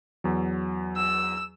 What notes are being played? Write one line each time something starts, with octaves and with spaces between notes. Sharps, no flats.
E2 F#3
E6